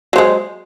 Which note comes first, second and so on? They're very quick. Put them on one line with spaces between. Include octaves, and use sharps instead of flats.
F#3 C5 G#3